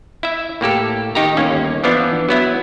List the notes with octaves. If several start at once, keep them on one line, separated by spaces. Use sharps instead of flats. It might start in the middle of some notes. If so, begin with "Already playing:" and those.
E4 E5
A2 A#3 G4 A4
D#3 D#4 G4 A#5
G1 D#2 A#3 C#4
E3 F3 B3 D4
F#3 B3 E4